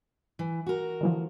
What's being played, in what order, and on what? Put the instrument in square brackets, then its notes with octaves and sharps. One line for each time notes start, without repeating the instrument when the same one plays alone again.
[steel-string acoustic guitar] E3
F#4 A#4
[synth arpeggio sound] D3 E3 F3